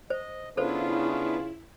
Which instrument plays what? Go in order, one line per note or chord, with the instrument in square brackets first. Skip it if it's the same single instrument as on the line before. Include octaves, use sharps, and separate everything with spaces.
[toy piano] C5 [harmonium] D#5
[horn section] C#3 F4 [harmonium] B3 D4 B4 [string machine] E4 [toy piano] A4 C5